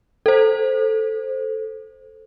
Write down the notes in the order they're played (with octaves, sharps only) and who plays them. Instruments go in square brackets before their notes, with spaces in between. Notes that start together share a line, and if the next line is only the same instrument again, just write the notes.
[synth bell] A4 C5